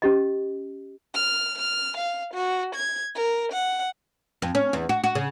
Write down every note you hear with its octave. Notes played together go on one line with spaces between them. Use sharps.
C#4 G4 D#5
F6
F6
F5
F#4
G#6
A#4
F#5
F2
C#4
E2
F#4
F#4
C#3